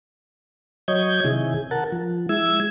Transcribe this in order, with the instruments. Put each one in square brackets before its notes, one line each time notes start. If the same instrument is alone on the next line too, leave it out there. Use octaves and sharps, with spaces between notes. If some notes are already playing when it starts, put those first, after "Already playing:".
[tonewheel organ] F#3 C#5 D#5 G6 G#6
C3 D#3 E4 G#4
A#4 F#5 A5
F3
G#3 E4 E6 G#6